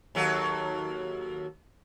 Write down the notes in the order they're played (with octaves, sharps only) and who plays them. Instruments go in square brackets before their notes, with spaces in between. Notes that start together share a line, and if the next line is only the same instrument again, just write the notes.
[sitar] D#2 F#3 A4